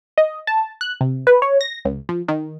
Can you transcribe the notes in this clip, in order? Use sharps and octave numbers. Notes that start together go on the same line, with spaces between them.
D#5
A5
F#6
C3
B4
C#5
A#6
C#2
F3
D#3